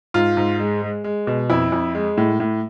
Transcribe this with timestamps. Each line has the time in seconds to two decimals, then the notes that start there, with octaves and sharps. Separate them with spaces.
0.14 G#2 F4
0.37 G#2
0.59 G#3
0.82 G#3
1.04 G#3
1.27 B2
1.50 F2 E4
1.72 F2
1.95 G#3
2.17 A2
2.40 A2